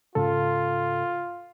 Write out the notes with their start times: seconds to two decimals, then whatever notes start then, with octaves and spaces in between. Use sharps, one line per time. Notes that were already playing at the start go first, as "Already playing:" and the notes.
0.15 G#2 C#3 F4 A4